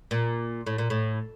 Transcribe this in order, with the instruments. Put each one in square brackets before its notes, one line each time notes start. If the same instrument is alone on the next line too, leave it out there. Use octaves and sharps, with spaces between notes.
[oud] A#2
A2
A#2
A2